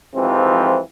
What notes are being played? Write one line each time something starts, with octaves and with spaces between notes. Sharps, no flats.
F2 G#2 C3 E3 F3 C4